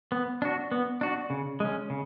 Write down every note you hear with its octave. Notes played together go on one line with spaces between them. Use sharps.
B3
D4 F#4
B3
D4 F#4
C#3
G#3 C#4
C#3